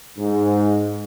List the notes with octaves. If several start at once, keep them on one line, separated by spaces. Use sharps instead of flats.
G#2